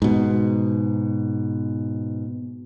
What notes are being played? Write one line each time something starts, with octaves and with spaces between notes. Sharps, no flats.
G#2 B2